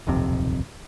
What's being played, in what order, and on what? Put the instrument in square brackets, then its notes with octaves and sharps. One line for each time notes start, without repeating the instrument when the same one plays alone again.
[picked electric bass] D#1 B1 F2 C3